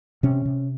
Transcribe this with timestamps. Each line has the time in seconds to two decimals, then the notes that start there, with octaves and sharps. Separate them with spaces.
0.23 C3 C#4
0.45 C3